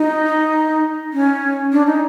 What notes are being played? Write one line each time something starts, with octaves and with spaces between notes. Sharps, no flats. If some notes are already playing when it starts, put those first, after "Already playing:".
Already playing: D#4
C#4
D4
D#4